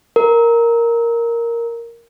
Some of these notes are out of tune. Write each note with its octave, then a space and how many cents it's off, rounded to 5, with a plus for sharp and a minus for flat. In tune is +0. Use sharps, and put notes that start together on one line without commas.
A#4 +0